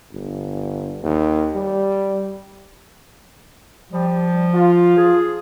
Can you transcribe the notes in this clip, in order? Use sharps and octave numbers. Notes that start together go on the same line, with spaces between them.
G1
D#2
G3
F3 G3
F4
G#4